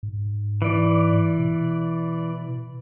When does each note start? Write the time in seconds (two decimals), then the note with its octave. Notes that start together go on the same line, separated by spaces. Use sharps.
0.03 G#2
0.62 E3 D5
1.38 B2